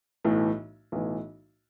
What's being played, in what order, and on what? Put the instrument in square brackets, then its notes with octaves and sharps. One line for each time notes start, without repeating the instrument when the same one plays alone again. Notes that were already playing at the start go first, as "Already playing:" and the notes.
[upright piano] B1 A2 E3
B1 A2 E3